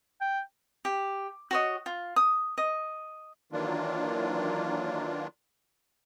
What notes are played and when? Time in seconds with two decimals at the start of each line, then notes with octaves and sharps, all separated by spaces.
0.21 G5
0.85 G4
1.51 F#4 C#5 D#5
1.86 F4
2.16 D#6
2.58 D#5
3.52 D#3 E3 F#3 A#3 D4 F4